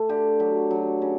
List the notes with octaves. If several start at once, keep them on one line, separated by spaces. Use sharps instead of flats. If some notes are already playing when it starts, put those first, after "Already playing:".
Already playing: A3
D3 G4
F#3 G4
F#3
C#3